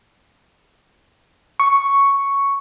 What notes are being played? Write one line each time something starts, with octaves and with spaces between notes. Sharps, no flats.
C#6